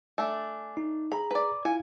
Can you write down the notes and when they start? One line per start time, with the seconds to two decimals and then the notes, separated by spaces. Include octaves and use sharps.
0.18 A3 D4 G#5
0.77 D#4
1.12 G#4 A#5 B5
1.31 B4 D5
1.65 E4 F4 F5 G#5